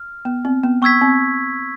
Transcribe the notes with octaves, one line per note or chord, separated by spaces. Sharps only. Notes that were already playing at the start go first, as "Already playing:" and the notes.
Already playing: F6
B3
C4
B3
B3 C#6 E6 G#6 B6
C4